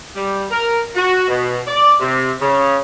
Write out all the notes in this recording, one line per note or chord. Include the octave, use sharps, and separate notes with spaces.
G3
A#4
F#4
B2
D5
C3
C#3